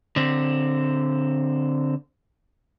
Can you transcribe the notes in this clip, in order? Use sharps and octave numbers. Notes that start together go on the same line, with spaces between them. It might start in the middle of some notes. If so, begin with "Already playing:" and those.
D3 C4